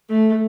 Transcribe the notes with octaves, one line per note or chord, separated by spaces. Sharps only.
A3